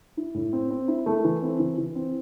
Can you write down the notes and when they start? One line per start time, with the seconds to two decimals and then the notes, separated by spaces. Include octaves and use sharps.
0.17 E4
0.34 A2
0.53 C4
0.71 C4
0.88 E4
1.06 A3
1.24 E3
1.42 C4
1.60 E3
1.78 E3
1.95 C4